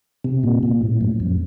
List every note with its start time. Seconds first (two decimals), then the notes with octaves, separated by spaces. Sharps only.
0.24 C3
0.43 A#2
0.63 A#2
0.81 A2
1.01 F#2
1.20 F2